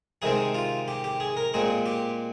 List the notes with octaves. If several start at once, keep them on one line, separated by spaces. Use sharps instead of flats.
C3 D#3 G#3 C4 G#4
F4
G4
G4
G#4
A#4
A#2 G#3 C4 G#4
G4